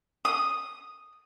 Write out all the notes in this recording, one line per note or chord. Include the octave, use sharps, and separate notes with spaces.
D#6